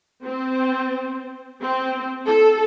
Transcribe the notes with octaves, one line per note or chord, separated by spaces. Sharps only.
C4
C4
A4